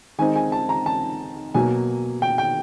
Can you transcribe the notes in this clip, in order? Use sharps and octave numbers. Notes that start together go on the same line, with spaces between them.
D#3 G#3 C4 D#4 G#5
G#5
A5
A#5
A5
B2 F#3 A#3 G#5
G5
G5